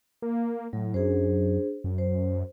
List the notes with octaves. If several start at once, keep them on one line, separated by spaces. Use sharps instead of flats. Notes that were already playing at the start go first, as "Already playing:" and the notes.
A#3
A2 F#3
F#2 D4 G#4 C5
F#2
C5